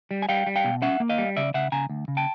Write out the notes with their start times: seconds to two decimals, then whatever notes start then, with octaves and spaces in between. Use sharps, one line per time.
0.11 G3
0.22 G#5
0.29 G3 F5 G5
0.47 G3
0.56 F5 G5
0.64 B2
0.82 C#4 E5 F#5
1.00 A#3
1.09 D#5 F5
1.18 G3
1.37 C#3 D5 E5
1.54 C#3 E5 F#5
1.72 C#3 G#5 A#5
1.90 D2
2.08 C#3
2.17 G5 A5